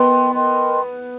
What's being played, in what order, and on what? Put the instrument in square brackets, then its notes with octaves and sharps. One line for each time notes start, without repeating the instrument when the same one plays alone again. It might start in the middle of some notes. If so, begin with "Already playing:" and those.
Already playing: [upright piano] B3 [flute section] A#4 D#5 G5 C6
[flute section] A#4 D#5 G5 C6